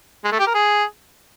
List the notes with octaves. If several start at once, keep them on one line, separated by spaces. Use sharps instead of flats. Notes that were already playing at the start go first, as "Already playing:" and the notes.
G#3
A3
G4
A#4
G#4